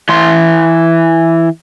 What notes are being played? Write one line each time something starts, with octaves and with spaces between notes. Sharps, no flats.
E3 C6